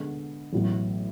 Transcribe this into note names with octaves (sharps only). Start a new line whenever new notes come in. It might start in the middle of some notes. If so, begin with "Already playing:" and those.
Already playing: D3 G#3 B3
A1 A2 F#3 B3